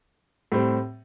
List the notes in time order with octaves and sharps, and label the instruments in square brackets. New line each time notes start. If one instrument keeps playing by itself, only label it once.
[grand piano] A2 G3 C4